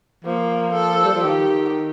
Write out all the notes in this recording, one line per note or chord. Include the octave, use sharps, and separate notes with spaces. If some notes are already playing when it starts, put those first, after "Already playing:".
F3 A#3
A4
G3
F3
D#3 G4